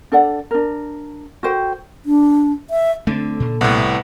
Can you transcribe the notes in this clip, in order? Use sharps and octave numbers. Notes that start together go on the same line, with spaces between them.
D4 A4 D5 F#5
D4 A#4
F#4 A4 C5 G5
D4
E5
D3 A3 B3 C4
A#2
C2 A2 B3